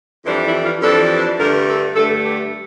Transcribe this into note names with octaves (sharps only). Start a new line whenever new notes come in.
F2 E3 G3 D4 C5
E4
F4
F2 E3 G3 D4 A4
G2 D3 A3 A#4
A4
G2 D3 A3 A4
G4